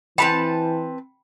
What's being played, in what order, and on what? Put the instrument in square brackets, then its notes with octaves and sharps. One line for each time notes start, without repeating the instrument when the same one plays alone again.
[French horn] E3 [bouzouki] C4 B4 A5 [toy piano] G5 B5